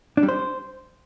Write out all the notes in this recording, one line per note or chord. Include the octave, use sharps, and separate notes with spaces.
D4
G3
C5